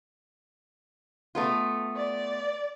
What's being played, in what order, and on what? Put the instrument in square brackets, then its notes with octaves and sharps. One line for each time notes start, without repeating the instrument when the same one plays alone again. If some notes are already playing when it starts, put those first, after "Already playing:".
[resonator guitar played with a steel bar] A3 B3 F4
[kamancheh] D5